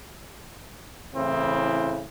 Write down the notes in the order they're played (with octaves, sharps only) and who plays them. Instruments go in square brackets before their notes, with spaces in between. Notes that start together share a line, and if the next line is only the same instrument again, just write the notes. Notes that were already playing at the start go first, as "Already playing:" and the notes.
[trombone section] A2 C#3 E3 C4 E4